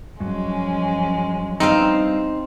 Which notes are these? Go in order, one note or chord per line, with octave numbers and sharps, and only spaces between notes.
G2 F3 F#3 G#3 C#4
G3 B3 C4 D4 D#4 F5